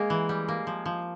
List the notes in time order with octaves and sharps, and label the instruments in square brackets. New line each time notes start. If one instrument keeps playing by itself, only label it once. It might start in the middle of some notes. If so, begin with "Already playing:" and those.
Already playing: [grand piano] G#3 G#4 [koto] A#3
[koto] E3
G3
A#3
F3
F3